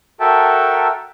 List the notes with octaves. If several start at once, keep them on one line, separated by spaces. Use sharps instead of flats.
F#4 A4 A#4 E5 G5 A5